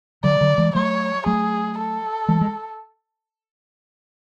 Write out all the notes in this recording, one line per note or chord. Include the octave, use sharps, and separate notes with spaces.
D3 F#3 D5
D3 F#3
E3 G#3
F#3 A3 C#5
F#3 A3 G#4
A4
E3 G#3
G#3